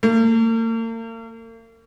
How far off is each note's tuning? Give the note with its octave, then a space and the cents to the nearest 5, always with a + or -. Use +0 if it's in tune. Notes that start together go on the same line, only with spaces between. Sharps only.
A#3 -45